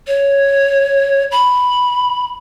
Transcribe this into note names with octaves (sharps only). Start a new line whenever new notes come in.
C#5
B5